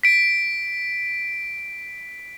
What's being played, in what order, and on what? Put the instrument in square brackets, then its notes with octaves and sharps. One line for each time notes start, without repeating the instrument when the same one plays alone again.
[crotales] B6 D7